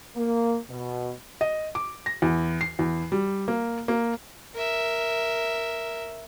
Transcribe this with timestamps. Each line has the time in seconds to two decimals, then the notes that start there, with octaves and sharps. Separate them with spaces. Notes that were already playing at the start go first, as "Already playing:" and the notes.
0.16 A#3
0.69 B2
1.41 D#5
1.75 D6
2.06 A#6
2.22 E2
2.61 C7
2.79 E2
3.12 G3
3.48 A#3
3.88 A#3
4.55 A#4 E5